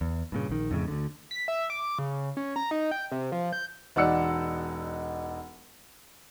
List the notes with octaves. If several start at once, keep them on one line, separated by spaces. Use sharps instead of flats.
E2
G2 A#2 C#3
A#1 D#3
F2 A2 C#3
D2 D3
B6
E5
D6
C#3
C#4
A#5
D#4
G5
C3
F3
G6
E1 D#4 D5 F#5 E6 C#7